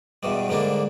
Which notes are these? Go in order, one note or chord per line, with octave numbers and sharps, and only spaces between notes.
E2 G2 B2 G3
G#2 D3 G3 A#3 D4